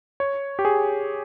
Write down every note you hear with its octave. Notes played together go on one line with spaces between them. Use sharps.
C#5
G4
G#4